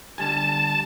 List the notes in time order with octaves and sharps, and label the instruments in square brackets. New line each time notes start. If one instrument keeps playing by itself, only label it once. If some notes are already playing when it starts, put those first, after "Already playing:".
[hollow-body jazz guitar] D3 G3 G#5 [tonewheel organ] A5